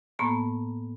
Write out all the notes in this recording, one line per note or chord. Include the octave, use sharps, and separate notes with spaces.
A2 A#3 B3 A5 A#5